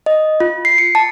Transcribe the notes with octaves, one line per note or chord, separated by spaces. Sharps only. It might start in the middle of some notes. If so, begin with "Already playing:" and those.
D#5
F4
C7
C#7
A5